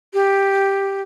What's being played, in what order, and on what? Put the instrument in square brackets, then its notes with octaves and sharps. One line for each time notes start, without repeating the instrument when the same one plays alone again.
[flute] G4